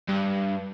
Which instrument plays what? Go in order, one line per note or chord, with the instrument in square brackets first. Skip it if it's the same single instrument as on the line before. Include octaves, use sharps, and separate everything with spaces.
[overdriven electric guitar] G2